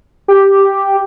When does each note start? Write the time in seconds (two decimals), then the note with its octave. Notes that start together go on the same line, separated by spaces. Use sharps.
0.28 G4